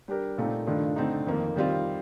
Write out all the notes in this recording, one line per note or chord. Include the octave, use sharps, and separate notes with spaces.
G3 D4 G4 A#4
A#2 A3 C4 D#4
G2 D#3 A3 D4 F4
D3 A3 C4 D#4
F2 D#3 A#3
D#3 G3 C4 F4